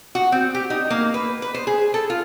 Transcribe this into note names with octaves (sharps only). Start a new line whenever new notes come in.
F#4
C4
G4
D#4
A#3
B4
B4
C5
G#4
A4
F4